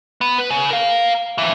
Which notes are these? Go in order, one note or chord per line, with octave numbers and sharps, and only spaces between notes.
B3
B4
C#3
A#4 F5
F2 E3